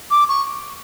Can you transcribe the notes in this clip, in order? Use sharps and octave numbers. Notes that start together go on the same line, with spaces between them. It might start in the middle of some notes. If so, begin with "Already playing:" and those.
D6
C#6